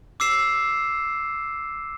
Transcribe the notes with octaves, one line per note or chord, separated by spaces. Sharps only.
D6 E6 C7 E7